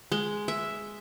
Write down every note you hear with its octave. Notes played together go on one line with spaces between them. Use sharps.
G#3
E5